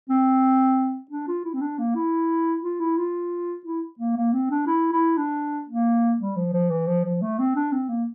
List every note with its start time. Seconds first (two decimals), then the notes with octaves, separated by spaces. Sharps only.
0.09 C4
1.11 D4
1.28 F4
1.45 E4
1.54 C4
1.61 D4
1.79 A#3
1.95 E4
2.63 F4
2.80 E4
2.97 F4
3.65 E4
3.99 A#3
4.16 A#3
4.33 C4
4.51 D4
4.67 E4
4.92 E4
5.17 D4
5.69 A#3
6.20 G3
6.36 F3
6.54 F3
6.70 E3
6.87 F3
7.05 F3
7.22 A3
7.39 C4
7.56 D4
7.72 C4
7.89 A#3